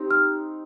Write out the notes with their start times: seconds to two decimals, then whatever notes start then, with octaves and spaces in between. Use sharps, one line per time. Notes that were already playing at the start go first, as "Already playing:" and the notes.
Already playing: C4 D#4 G4
0.11 F6